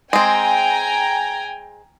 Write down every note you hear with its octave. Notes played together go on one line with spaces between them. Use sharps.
G#3 C4 G5 G#5 A#5